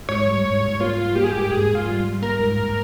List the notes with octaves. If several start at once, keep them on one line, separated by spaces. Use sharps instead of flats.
G#2 C#5
G3
G#2
G#2
A#3 F4
A#3
A#3 G4
G#4
G#2 G4
G#2 G#4
G#2
F4
G3
G3
A#3 A#4
G#2
G#2